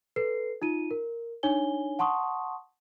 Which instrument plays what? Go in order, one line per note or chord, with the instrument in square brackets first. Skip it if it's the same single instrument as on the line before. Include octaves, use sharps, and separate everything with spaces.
[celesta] A4 B4 C7
D#4 F4 D#7
A#4
D4 D#4 C#5 G#5 G7
F#5 A5 C6 C#6 D#6